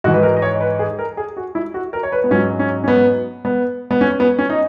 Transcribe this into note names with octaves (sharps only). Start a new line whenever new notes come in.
G#2 E3 F#4
B4
A#4
D#5
C#5
B4
G#4
A#4
G#4
F#4
E4
F#4
A#4
C#5
B4
B3
G#2 F#3 C#4
C#4
C#4
B3
B3
B3
C#4
B3
C#4
D#4